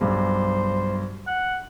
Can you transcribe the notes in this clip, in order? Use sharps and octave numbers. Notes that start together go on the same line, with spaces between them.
B1 G2 C5
F#5